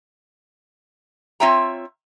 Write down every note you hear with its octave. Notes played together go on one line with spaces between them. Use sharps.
C4 F4 C#5 E5 G5 A#5